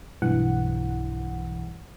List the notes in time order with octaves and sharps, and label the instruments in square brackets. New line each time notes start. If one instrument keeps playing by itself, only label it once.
[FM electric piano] B1 G2 E3 F#5